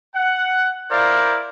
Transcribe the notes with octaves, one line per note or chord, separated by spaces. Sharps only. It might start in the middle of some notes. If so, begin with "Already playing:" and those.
F#5
E4 A#4 C5 D5 F5